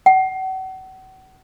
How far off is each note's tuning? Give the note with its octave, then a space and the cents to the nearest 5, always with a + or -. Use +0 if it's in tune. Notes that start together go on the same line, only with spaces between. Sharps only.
F#5 +35